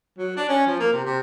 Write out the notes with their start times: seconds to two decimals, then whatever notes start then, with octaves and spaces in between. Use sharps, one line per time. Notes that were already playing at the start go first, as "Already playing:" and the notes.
0.18 F#3
0.37 D4
0.49 C#4
0.67 F3
0.80 A#3
0.92 C3
1.05 C3